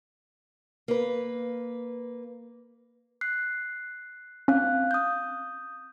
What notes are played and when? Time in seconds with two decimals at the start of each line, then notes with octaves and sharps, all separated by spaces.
0.88 A#3 B4
3.21 F#6 C7
4.48 C4 C#4 F5 F#6
4.91 D#6 G6